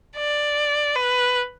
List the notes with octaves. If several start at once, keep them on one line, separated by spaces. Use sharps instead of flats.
D5
B4